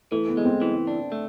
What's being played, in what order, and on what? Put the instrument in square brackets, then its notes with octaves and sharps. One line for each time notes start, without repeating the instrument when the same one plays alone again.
[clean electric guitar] E3 [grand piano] A3
[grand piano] B3
[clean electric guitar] G#3
[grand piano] C4
[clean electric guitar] E3
D4
A3